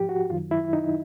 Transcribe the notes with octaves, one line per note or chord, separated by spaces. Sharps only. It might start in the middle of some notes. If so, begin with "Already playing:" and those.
Already playing: G#2 F3 G4
F#4
F#2 D#3 F#3 F4
E4
D#4